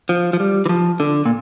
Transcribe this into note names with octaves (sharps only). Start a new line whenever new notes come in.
F3
F3
G3
E3
F3
D3
A#2